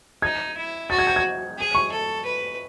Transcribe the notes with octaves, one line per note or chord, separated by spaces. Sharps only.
D#4 G#6
E4
F#4 A6
G#6
G6
G#6
G#4
C#6
A4
B4